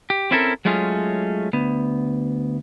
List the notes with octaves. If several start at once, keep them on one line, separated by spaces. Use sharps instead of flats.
G4
C4 C#4 E4 F#4 A4 A#4
F#3 G#3 A3 C#4 F4 G#4
D2 B3